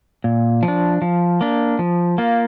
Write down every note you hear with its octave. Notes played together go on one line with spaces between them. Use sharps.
A#2
F3
D4
F3
A#3 D4
F3
A#3 F4